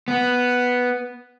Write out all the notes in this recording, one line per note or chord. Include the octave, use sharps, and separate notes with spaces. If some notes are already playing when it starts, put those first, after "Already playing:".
B3